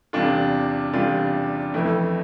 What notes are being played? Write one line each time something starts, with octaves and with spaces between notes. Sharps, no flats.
E2 C3 G3 D4 F4
E2 C3 G3 D4 F4
F2 E3 A3 E4